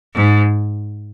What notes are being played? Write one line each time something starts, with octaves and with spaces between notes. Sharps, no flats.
G#2